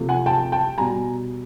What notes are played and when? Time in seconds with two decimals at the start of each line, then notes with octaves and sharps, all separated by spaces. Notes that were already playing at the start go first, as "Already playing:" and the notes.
Already playing: C3 F3 A3
0.09 F#5 G#5
0.26 G5 A5
0.52 G5 A5
0.78 B2 G3 G#5 A#5